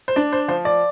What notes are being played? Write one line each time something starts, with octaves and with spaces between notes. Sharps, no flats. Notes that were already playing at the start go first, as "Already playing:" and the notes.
C5
D4 D5
C5
F3 C5
D5